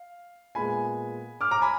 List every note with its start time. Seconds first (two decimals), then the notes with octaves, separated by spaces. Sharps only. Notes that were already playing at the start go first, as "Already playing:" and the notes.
Already playing: F5
0.55 A#2 G#3 B3 G#5 B5
1.41 D6 F6
1.51 A#5 D6
1.62 G#5 B5